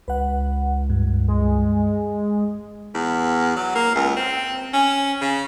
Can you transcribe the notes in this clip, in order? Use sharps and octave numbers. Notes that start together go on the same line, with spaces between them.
C#2 B4 F#5
G2
G#3
E2
F#3
A#3
C#2
C4
C#4
C#3